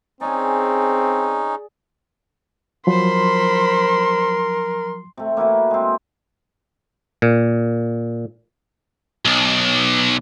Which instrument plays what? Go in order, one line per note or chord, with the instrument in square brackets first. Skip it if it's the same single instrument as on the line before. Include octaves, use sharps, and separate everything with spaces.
[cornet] C4 [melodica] C#4 D#4 [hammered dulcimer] G#4 D5
[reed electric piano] F3 F#3 [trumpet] A#4 [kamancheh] C5 B5 [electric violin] C6
[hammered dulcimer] C3 A3
A#3 E4 F#4 B4
G#3 C4
[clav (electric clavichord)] A#2
[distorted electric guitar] B1